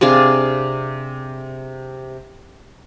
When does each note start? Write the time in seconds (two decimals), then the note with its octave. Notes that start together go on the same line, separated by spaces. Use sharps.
0.01 C3 D4 G#4 F5